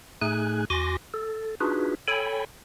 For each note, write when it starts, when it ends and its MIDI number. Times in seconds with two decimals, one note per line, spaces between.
0.22 0.65 45
0.22 0.65 57
0.22 0.65 63
0.22 0.65 68
0.22 0.65 80
0.22 0.65 90
0.70 0.97 40
0.70 0.97 66
0.70 0.97 80
0.70 0.97 84
0.70 0.97 86
0.70 0.97 94
1.14 1.55 69
1.60 1.95 62
1.60 1.95 63
1.60 1.95 65
1.60 1.95 66
1.60 1.95 68
1.60 1.95 71
2.08 2.45 69
2.08 2.45 73
2.08 2.45 79
2.08 2.45 80
2.08 2.45 83